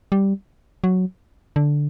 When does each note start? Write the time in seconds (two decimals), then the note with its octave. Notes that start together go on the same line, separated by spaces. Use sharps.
0.12 G3
0.84 F#3
1.56 D3